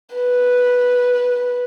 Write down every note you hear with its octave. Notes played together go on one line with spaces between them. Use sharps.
B4